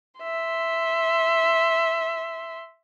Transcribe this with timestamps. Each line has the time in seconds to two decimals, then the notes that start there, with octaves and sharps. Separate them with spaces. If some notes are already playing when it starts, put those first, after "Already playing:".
0.21 E5 C6